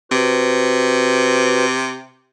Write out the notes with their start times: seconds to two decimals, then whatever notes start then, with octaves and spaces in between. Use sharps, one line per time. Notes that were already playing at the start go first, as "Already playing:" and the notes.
0.11 C3 F#4 B4 C5